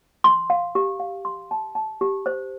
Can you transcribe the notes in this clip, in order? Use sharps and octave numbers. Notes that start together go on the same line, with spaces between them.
C6
F5
G4
F5
C6
A5
A5
G4
C5